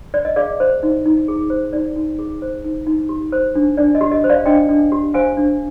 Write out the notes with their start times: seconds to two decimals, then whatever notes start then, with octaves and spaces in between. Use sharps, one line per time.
0.14 D5
0.25 D#5
0.36 G#4 D5 F5
0.60 C5
0.83 D#4
1.05 D#4
1.28 G#4
1.50 C5
1.73 D#4 D5
1.96 D#4
2.19 G#4
2.42 C5
2.64 D#4
2.87 D#4
3.09 G4
3.32 C5
3.55 D4
3.77 D4 D5
3.95 D#5
4.01 G4
4.12 D#5
4.24 C5
4.29 D5 F5
4.46 D4 D#5 G5
4.69 D4
4.92 G4
5.14 C5 F5 G#5
5.37 D4